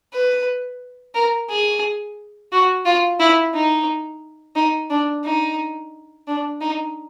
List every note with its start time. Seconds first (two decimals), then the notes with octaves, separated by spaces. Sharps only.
0.13 B4
1.15 A#4
1.50 G#4
2.52 F#4
2.86 F4
3.20 E4
3.54 D#4
4.56 D#4
4.90 D4
5.24 D#4
6.27 D4
6.61 D#4